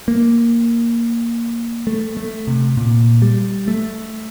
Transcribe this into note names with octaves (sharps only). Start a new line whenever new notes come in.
A#3
A3
A3
C3
A#2
G3
A3